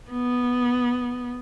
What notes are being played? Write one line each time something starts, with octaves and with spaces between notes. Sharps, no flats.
B3